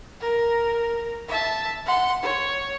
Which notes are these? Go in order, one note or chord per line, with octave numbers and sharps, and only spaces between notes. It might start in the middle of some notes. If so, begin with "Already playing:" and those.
A#4
E5 A5
F#5 C6
C#5